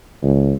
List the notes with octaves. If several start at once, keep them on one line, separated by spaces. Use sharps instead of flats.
C#2